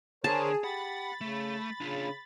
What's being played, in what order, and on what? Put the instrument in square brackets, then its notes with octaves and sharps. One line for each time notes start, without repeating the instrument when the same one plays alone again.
[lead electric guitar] D3 D4 [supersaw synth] G#4 [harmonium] A#4 C5 C#5 [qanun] A5
[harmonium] G4 [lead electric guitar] F#5 [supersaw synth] B5 A6
[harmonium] C#3 [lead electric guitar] A3
[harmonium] C#3 [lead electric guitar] D4 F4